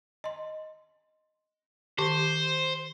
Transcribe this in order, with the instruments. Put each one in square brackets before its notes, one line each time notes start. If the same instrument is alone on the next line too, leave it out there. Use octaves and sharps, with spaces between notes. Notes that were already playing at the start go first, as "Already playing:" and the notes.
[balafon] D#5 C6
[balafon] D#3 G4 C#6 [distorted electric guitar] C5